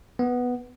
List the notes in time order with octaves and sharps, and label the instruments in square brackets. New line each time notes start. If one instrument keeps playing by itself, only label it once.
[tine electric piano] B3